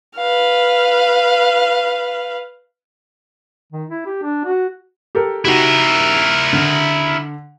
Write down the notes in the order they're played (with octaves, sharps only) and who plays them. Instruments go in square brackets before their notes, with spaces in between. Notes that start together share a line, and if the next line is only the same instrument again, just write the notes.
[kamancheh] B4 F5
[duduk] D#3
E4
G4
D4
F#4
[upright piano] G4 A4 A#4
[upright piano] D#4 F#4 G4 [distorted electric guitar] E4 A#4
[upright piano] D3 F7